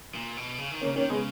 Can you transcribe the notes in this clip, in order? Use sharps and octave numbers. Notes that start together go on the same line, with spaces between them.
A#2
B2
C#3
D#3
A#3 C#4
C#3
D#3 A#3 C#4
C#3 G#3 B3